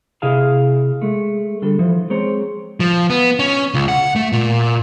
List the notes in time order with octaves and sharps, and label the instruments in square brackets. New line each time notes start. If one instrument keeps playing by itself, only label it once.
[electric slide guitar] C3 E4 G#4 D#5 F5 A5
G#3 A3
D3 G3 A4
E3 F3
G#3 C4 C5 C#5 A#5
[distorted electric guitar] F3
B3
C#4
C#2
F#5
A3
A#2